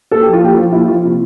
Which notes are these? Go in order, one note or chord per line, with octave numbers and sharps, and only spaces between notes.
A#2 A4
F3 G4
F4
A#2 G4
F3 F4
A#2 E4
F3 F4
C3